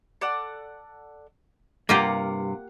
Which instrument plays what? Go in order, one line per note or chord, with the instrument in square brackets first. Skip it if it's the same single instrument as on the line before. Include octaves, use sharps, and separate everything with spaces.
[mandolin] A4 D5 F#5
[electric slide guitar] G2 C3 [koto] A#3 F4 G4 [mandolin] F5 F#5 D6